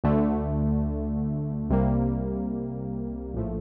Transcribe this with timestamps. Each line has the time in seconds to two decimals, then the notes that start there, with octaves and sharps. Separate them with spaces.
0.04 D2 D3 A3
1.70 C2 C3 G3 A#3
3.34 A#1 A2 F3 A3